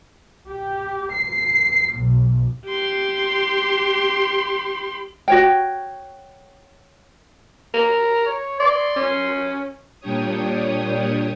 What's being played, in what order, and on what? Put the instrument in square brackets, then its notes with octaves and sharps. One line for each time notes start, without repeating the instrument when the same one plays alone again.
[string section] G4
C7
B1
[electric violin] G4 C6
[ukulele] F#4 C#5 G5
[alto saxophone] A#4
[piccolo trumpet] C#5
[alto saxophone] D5 [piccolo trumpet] C6
[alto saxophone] C#4
[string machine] A#2 G3 D4 G4 C#5 D#6